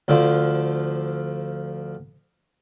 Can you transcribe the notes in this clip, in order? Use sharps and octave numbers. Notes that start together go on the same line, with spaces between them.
D2 D3 F3